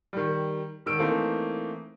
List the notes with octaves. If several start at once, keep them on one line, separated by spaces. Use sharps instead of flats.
D#3 G3
E1 D#3 E6 D7
E3 A3 A#3 C4 D#4